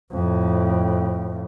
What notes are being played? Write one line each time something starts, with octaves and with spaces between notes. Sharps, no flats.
F2 A2